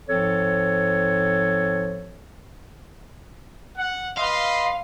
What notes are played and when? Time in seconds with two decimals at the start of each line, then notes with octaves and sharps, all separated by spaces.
0.09 G#2 F3 C4 A4 C#5
3.77 F#5
4.18 B4 D#5 F5 C6